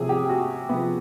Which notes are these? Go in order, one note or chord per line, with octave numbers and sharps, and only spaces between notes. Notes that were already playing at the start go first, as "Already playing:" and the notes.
Already playing: C3 F3 G#4
G4
F#4
C3 F3 B3